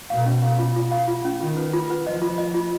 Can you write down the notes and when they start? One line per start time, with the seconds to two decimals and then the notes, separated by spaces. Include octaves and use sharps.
0.10 B2 F5
0.26 C#4
0.43 F5
0.59 F4
0.76 F4
0.91 F5
1.08 F4
1.25 C#4
1.41 D#3 F4
1.57 B4
1.73 F4
1.90 B4
2.06 F3 D#5
2.22 F4
2.38 D#5
2.54 F4